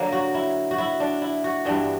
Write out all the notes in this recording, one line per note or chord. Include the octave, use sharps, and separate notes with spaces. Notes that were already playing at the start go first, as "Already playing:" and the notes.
Already playing: D3 F#3 A#3
F#4
E4
F#4
E4
D4
E4
F#4
G2 E3 B3 D4